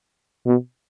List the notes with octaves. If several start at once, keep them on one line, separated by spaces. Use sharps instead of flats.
B2